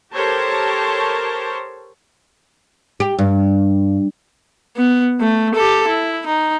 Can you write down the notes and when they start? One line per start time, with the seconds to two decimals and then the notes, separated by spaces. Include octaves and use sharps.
0.12 G4 A4 A#4 C5 C#5 A5
3.00 G4
3.19 G2
4.76 B3
5.20 A3
5.55 G4 A4
5.87 E4
6.27 D#4